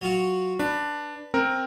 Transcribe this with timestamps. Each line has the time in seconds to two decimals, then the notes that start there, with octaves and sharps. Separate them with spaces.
0.01 F#3 F4 F#4
0.59 D4 B4
1.34 C4 A#4